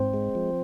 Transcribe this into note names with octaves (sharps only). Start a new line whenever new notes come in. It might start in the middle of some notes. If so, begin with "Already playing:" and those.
Already playing: G#2 C4 C5
G#3
F3